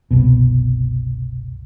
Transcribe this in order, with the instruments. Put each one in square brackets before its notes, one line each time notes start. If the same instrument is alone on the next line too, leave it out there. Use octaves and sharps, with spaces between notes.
[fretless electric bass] F#1 C2 B2